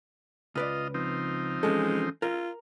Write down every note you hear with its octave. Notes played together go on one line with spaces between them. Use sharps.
C#2 F4 B4 D5 D#5
F3 C4 D#4
E3 G#3 C#4 A4
F4 A#4